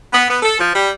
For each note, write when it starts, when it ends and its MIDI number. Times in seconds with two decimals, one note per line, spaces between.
0.12 0.26 59
0.29 0.40 59
0.43 0.59 69
0.59 0.70 53
0.74 0.88 55